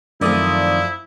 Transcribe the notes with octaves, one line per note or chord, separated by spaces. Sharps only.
F#2 D#3 F3 A3 C4 E4 D5 D#6